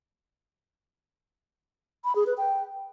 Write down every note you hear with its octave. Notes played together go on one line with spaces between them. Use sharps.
B5
G#4
B4
G5